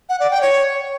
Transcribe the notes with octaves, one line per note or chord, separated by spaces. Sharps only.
F#5
D5
G5
C#5